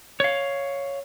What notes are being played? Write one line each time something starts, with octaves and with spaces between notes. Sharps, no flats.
C#5 F5